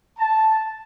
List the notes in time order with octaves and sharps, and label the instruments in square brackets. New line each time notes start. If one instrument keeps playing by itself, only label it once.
[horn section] A5